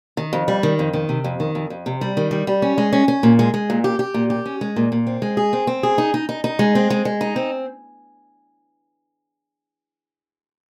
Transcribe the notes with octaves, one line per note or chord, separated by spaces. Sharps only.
D#3
F2
G3
D#3
F2
D#3
C3
F2
D#3
F2
F2
C3
G3
D#3
G3
G3
C#4
G#3
C#4
C#4
A#2
G#3
G#3
A#2
G4
G4
A#2
G4
C#4
G#3
A#2
A#2
C4
G#3
G#4
C4
C4
G#4
D#4
D#4
D#4
D#4
G#3
C4
G#3
G#3
D#4
C4